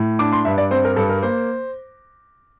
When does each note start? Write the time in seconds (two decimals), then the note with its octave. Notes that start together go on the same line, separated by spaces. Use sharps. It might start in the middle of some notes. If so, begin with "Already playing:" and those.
Already playing: A2
0.19 D4 D6
0.32 C6
0.45 G2 E5
0.58 D5
0.71 C4 C5
0.85 A#4
0.96 G2 A4
1.09 A#4
1.23 A#3 C5